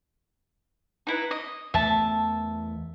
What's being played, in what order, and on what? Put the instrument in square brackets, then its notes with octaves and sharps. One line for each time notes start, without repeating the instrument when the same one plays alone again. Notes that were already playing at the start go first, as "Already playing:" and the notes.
[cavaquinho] D#4 E4 B4
D#5
[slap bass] E2 A3 [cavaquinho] E5 A5